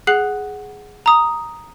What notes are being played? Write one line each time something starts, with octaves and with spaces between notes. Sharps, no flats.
G#4 F#5 F#6 C7 F#7
A#5 D#6